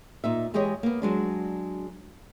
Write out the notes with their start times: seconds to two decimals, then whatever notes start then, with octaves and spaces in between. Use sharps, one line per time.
0.24 A#2 D#4 E5
0.54 E3 G#3 G4 G#4 C#5 D#5
0.83 A#3 B3
1.02 F#3 G#3 D4